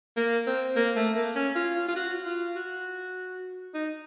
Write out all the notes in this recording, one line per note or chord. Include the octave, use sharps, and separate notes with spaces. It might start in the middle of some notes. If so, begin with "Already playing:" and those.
A#3
C4
A#3
A3
A#3
C#4
F4
F4
F4
F#4
F4
F#4
D#4